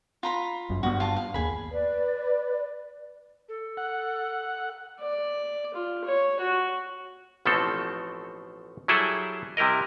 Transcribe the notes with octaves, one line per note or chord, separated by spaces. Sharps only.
F4 A#5 B5
G1 F#2
G2 A#3 B3 F#4
F4 F5 A5
F5
D1 D#2 G#4 B5
B4 D5
A4
F#5
D5
F4
C#5
F#4
A1 B2 F3 A3 C4 A4
F#3 G3 E4 G#4 A4 E5
C3 G3 E4 A#4 D#5